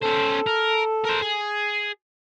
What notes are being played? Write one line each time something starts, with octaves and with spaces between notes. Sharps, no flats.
C#4 A4 C5
A#4
A#4 C5
G#4